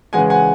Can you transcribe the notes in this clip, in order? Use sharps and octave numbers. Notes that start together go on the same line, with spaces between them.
C#3 E3 G#3 F#5 G#5
F#5 G#5